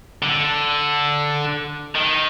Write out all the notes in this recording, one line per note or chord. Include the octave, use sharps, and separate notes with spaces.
D3
D#3